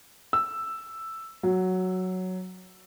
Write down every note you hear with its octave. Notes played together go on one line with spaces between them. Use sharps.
E6
F#3